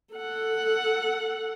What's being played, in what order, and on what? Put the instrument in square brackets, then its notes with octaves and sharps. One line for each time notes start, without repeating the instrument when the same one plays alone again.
[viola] A4 F#5